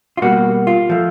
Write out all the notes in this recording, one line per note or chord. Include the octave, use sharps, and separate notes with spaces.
F4
B2 G3 A#3 F#4
F4
F3 A3